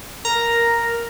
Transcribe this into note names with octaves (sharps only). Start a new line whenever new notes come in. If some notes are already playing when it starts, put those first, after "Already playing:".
A#4 A#5